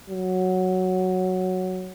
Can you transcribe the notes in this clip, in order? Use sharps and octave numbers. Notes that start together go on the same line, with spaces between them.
F#3